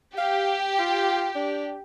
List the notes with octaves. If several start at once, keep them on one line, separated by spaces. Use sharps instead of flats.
G4 F5
F4
D4